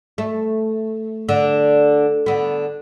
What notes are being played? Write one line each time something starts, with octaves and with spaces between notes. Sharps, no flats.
A3
D3
D3 B3